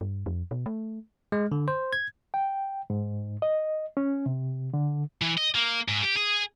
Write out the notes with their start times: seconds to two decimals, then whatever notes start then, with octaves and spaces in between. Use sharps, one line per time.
0.01 G2
0.26 F2
0.51 B2
0.66 A3
1.32 G#3
1.52 D3
1.68 C5
1.93 G#6
2.34 G5
2.90 G#2
3.42 D#5
3.97 C#4
4.26 C3
4.74 D3
5.22 E3
5.38 D#5
5.55 A#3
5.88 G#2
6.03 G4
6.17 G#4